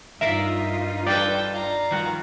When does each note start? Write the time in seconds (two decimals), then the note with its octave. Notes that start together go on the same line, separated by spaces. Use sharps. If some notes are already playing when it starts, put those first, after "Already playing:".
0.21 G2 D#4 F4 A#4 D5 E5 F5 B6
1.07 G4 A4 B4 D5 G5
1.53 F5 A#5
1.91 D#3 F3 G3 F4 F#4